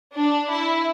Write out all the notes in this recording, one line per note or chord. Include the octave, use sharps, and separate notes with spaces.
D4
E4